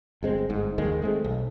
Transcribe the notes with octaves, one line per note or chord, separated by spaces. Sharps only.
G1 G#3 C4
G1 G#2
F#1 D#2 D#3 G#3
G#3 A3 C4
B1